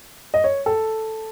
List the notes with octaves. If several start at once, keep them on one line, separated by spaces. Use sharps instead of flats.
D#5
C#5
A4